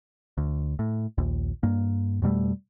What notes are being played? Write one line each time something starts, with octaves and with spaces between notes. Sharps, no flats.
D2
A2
A#1 D#2
G2 A#3
F2 B2 G3 A3